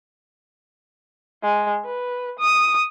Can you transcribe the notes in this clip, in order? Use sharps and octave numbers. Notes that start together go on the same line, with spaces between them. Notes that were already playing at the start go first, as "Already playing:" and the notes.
G#3
B4
D#6